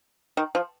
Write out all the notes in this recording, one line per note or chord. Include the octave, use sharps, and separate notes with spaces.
D#3
F3